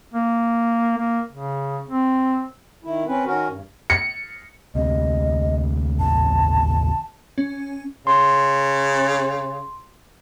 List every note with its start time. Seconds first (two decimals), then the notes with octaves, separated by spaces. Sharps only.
0.13 A#3
0.97 A#3
1.32 C#3
1.89 C4
2.84 D#3 E4
3.07 C4 C#4 B4
3.26 D#3 C#4 F#4 A#4
3.50 G2
3.90 C#7
4.75 D2 C3 D#5
5.99 A1 D#2 C#3 A5
7.38 C#4
8.07 C#3 C6